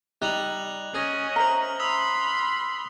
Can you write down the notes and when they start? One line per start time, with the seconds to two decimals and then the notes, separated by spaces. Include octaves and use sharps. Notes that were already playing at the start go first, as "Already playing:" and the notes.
0.22 G3 D#4 F#6 F7 F#7
0.95 C#4 G#4 D#5
1.36 C5 E5 A#5 F6 F#7
1.80 B5 C6 D#6 E6 F7